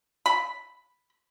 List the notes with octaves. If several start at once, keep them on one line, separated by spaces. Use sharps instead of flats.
B5